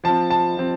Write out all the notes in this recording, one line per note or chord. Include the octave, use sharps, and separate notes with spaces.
F3 C4 A5
A5
F3 C4